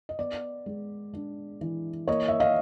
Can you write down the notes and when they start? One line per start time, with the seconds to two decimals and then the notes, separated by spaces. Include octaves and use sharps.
0.09 D#5
0.19 B3 D5
0.66 G#3
1.14 D4
1.61 E3
2.08 A#3 C#5 D#5
2.28 E5
2.40 D#5 F5